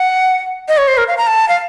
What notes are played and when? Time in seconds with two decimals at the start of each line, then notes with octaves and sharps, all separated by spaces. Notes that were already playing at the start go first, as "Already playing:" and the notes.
Already playing: F#5
0.68 D#5
0.78 C#5
0.88 C5
0.97 A#4
1.08 F5
1.18 A#5
1.27 A5
1.49 F5